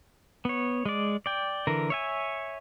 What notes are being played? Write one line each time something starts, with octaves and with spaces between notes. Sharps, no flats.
B3 C#5
G#3 D5
D5 G5
D3 E3 A#4
C#5 E5 G#5